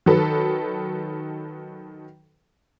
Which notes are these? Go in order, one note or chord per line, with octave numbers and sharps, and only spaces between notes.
D#3 F#3 A4 B4